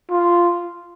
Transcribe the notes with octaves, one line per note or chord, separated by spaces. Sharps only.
F4